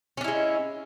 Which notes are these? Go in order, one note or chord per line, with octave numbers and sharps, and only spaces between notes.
G#3 C#4 D4 E4